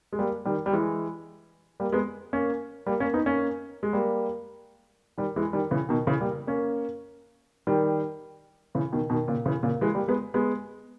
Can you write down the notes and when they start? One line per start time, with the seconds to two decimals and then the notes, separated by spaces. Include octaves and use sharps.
0.13 G#3
0.19 G3 A#3
0.45 D#3 G3
0.66 G3
0.72 E3 G#3
1.80 G3 A#3
1.92 G#3 B3
2.33 A#3 C#4
2.86 G3 A#3
3.00 A#3 C#4
3.14 B3 D#4
3.26 A#3 C#4
3.83 G#3
3.93 G3 A#3
5.18 D#3 G3
5.36 E3 G#3
5.53 D#3 G3
5.71 C#3 E3
5.89 B2 D#3
6.07 C#3 E3
6.20 G3 A#3
6.47 A#3 C#4
7.67 D#3 G3
8.75 C#3 E3
8.92 B2 D#3
9.10 B2 D#3
9.28 A#2 C#3
9.46 C#3 E3
9.63 A#2 C#3
9.81 E3 G#3
9.95 G3 A#3
10.08 G#3 B3
10.34 G#3 B3